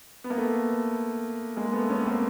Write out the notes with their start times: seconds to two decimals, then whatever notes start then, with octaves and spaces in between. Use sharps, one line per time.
0.24 B3
0.30 A#3
0.38 A3 B3
1.57 G#3 A#3
1.73 A3 B3
1.90 B3 C#4
2.06 A#3 C4